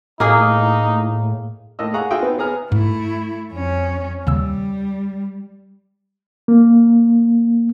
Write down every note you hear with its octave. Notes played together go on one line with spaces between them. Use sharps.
A2 A#3 D#4 G#4
A2 A#3 D#5 E6
G#4 F5 F#5 A#5 C#6
D#4 F4 F#4 G#4 E5 G5
B3
B3 G#4 A#5 F6
G#2 A3 E4
F2 C#4
D#2 C#3 G3 E6
A#3